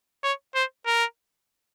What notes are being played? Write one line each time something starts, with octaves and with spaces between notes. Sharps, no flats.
C#5
C5
A#4